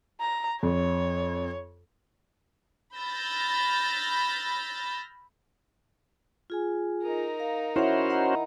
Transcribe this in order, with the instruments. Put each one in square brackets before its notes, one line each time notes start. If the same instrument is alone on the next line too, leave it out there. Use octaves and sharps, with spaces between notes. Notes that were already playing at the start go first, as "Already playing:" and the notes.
[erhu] A#5
[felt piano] F2 [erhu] C#5
[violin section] B5 E6 F6 G6 A6 A#6
[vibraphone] F4 G#4 G#5
[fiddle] D#4 A#4
[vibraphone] F5
[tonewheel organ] C#4 F#4 C5 [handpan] E4 [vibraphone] C#5 F#5
[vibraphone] D#5 F#5 A#5